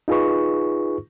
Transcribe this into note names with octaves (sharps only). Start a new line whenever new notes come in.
D#4 F4 G#4 B4 C#6